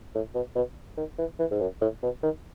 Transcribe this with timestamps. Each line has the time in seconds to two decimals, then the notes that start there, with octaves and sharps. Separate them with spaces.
0.15 A2
0.35 B2
0.56 B2
0.97 D#3
1.19 E3
1.39 E3
1.51 G#2
1.61 F#2
1.81 A2
2.03 B2
2.23 D#3